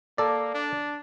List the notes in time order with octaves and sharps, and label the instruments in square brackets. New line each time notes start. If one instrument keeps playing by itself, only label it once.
[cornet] A#3 [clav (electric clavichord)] A4 D5
[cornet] D4